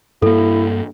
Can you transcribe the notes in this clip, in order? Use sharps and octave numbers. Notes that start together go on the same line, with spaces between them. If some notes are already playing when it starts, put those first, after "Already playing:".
G2 A#3 E4 A4